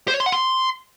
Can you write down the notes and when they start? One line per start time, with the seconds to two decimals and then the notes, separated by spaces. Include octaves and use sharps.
0.08 C5
0.14 C#5
0.20 C6
0.26 F#5
0.32 C6